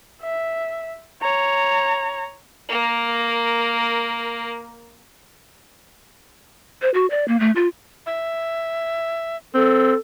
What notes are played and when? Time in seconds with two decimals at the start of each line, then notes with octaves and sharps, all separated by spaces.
0.22 E5
1.22 C#5 A#5
2.69 A#3 A#4
6.82 C5
6.94 F#4
7.10 D5
7.28 A#3
7.40 A3
7.56 F4
8.06 E5
9.55 C4 A4